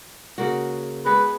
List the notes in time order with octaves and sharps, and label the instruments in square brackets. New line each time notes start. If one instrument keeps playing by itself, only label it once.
[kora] C#3 A#3 F#4
[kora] G#3 B3 [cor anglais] B4